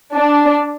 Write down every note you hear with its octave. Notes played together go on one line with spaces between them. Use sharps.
D4